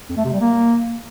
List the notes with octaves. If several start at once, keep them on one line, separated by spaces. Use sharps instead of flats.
F2
A3
C3
G3
A#3